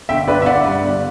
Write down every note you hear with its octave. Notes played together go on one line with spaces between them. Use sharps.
G1 E5 G5
G1 B4 D5
E5
G1 D5 F#5
G2
G1